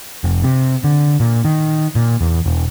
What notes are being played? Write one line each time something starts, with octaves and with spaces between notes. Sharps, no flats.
F1
C3
D3
A#2
D#3
A#2
E2
E1